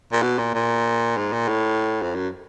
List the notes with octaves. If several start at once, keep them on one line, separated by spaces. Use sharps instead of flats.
A#2
B2
A#2
A#2
G#2
A#2
A2
F2
F#2